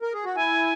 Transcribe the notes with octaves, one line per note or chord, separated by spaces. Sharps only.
A#4
G#4
F#4
E4 G#5